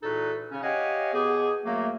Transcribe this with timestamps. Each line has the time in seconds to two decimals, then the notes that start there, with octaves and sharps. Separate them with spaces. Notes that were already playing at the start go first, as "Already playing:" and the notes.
0.03 E2 A#2 D#4 F#4 A4 B4
0.51 C#3 C#4
0.63 G4 C#5 D#5 F5 F#5 G#5
1.13 B2 B3 G4 G#4
1.65 F#2 F#3 A3 A#3